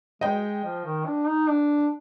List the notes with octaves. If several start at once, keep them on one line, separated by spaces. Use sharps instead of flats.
G#3 D#5 G5
F3
D#3
D4
D#4
D4